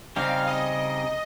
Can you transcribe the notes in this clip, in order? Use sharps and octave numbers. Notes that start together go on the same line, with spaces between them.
C#3 G3 C4 D#4 G4 F5
D#5